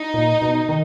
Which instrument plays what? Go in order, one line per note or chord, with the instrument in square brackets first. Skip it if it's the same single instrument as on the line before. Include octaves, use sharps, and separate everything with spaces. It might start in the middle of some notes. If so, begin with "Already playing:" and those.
Already playing: [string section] D#4
[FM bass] A#2
B2
D#3